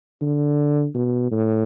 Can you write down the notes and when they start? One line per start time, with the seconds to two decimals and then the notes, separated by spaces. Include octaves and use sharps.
0.22 D3
0.95 B2
1.31 A2